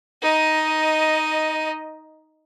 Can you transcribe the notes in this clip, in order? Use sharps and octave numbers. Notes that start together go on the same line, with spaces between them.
D#4 D#5